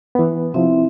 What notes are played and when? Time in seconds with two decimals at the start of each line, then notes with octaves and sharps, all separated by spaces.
0.15 E3 B3
0.54 C3 F3 C4 E4 E5